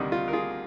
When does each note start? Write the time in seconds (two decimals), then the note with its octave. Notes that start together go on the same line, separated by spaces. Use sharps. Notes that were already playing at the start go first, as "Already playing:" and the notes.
Already playing: D2 C3 D#3 G3 D#4
0.12 F4
0.28 A#4
0.33 F4 G#4